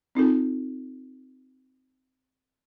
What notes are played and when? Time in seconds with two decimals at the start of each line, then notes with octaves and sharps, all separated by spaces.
0.15 C4 D#4 F4 A4